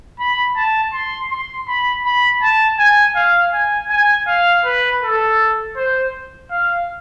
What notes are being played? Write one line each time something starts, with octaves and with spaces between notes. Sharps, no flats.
B5
A5
C6
C6
B5
B5
A5
G#5
F5
G#5
G#5
F5
B4
A4
C5
F5